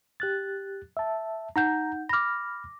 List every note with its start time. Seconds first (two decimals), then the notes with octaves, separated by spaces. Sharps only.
0.20 G4 F#6 A6
0.97 E5 A5
1.56 D#4 F#5 A#5 G6
2.09 B5 D6 F6 A#6